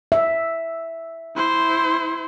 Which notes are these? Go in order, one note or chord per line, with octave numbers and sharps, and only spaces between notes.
E5
E4 C5